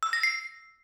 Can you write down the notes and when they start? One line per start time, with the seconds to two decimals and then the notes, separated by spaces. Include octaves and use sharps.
0.03 E6
0.13 A#6
0.23 C7